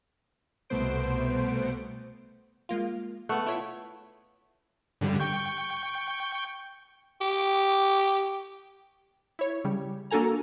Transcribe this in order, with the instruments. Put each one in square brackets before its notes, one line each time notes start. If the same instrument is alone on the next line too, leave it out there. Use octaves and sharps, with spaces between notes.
[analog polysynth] C2 B2 A3 B3 C5 D7
[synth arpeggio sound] G#3 A#3 F4
[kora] A3 B3 [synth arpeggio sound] F#5 C#6
[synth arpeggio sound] E4 F4 C#5
[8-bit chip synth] G2 D3 G3
G5 C#6 G6
[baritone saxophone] G4
[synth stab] E4 C#5
C#3 G3
A#3 D4 F#4 A4 G#5 A#5